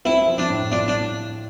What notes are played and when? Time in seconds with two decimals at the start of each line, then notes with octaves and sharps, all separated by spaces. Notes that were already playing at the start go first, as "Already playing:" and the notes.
0.05 C4 E4
0.28 F3
0.38 D4
0.50 A2
0.71 D4 F4
0.88 D4